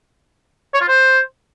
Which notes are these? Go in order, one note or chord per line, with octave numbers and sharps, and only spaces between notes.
C#5
F4
C5